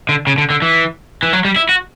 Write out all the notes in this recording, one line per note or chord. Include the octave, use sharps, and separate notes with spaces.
D3
C#3
D3
D3
E3
E3
F#3
G3
E4
F#4